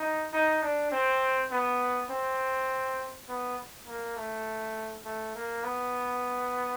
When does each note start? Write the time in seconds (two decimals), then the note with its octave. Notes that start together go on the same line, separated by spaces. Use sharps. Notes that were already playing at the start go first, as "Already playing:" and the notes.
Already playing: D#4
0.33 D#4
0.63 D4
0.92 C4
1.51 B3
2.10 C4
3.29 B3
3.88 A#3
4.17 A3
5.05 A3
5.35 A#3
5.64 B3